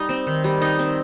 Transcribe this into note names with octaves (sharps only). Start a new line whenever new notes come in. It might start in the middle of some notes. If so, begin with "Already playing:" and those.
Already playing: G3 D#4
C4
D#3
G3
D#4
C4